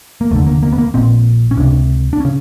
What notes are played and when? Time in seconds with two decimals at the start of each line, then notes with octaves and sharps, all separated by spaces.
0.21 A#3
0.31 F1 D#2 D3 A3
0.47 A#3
0.63 A#3
0.72 B3
0.78 A#3
0.94 A#1 A#2 C4
1.51 C#4
1.57 C#2 C3 D4
2.13 D4
2.20 C#3 C#4